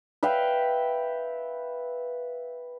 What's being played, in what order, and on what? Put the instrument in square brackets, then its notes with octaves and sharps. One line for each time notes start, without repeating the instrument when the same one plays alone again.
[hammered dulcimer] B4 E5 F5 G5